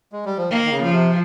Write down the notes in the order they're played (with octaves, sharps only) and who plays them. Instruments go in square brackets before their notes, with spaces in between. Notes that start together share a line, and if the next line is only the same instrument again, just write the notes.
[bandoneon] G#3
G3
F3
[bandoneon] D#3 [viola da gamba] A#3
[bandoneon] D#3
C#3
[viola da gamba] F3
[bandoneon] C3